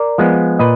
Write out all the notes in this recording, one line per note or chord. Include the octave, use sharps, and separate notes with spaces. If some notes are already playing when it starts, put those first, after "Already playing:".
Already playing: A#4 D5
F3 G#3 B3
A#2 B4 D#5